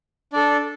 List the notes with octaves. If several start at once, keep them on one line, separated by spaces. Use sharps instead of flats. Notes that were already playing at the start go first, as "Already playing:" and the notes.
D4 A4 D5